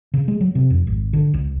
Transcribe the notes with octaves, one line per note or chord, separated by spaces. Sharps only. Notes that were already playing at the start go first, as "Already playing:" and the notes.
C#3
G#3
F#3
C3
F2
G#1
D3
C#2